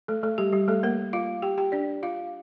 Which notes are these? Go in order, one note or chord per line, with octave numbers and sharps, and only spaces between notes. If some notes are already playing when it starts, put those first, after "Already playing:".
A3 A4
A3 A4
G3 G4
G3 G4
A3 A4
A#3 A#4
F4 F5
G4 G5
G4 G5
D4 D5
F4 F5